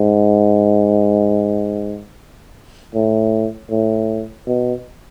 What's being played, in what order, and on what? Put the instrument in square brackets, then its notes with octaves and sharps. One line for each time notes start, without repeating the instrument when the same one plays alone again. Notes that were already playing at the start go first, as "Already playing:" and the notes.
Already playing: [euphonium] G#2
A2
A2
B2